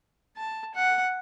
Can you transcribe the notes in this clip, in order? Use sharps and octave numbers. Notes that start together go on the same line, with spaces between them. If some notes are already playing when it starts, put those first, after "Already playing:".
A5
F#5